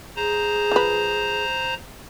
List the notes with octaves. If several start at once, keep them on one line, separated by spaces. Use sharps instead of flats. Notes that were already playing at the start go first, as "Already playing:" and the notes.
G#4 C5 A#5
F3 B4